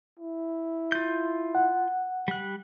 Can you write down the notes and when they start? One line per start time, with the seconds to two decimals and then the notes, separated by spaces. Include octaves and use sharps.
0.20 E4
0.92 F4 G6
1.55 F#5
2.28 G3 F#6